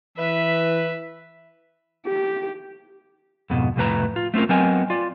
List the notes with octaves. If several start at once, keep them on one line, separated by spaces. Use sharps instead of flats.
E3 B4 E5
G4
F2 G#2 B2
C2 F2 A2 B4 A#5
F4
A3 C4 C#4 F4 A#4
F#3 B3 C4 A#4 D#5 G#5
F4 D5